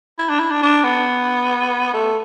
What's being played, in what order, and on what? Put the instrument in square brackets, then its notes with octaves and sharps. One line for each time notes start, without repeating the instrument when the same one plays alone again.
[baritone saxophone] E4
D4
E4
D4
D4
B3
A3